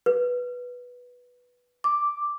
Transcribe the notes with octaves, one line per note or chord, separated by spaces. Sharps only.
B4
D6